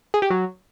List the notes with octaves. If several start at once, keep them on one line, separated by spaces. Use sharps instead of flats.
G#4
G4
F#3